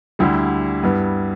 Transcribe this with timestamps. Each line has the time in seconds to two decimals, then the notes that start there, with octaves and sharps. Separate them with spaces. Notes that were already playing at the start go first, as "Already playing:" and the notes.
0.19 D2 D3 G3 E4 G4
0.83 G2 G3 B3 E4